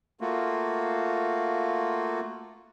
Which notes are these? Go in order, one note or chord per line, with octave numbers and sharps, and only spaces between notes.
A3 A#3 F4 F#4